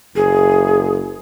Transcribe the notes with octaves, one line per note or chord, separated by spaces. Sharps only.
F#1 G#4